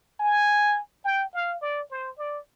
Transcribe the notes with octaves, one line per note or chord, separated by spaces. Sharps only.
G#5
G5
F5
D5
C5
D5